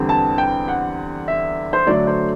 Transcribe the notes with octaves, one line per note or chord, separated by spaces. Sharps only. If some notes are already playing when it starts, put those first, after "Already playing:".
Already playing: E2 D3 G3 C4
A5
G5
F#5
E5
C5
D3 F#3 A3 D4 D5
C5